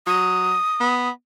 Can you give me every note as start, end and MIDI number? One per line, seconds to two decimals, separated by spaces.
0.07 0.55 54
0.07 1.09 87
0.80 1.10 59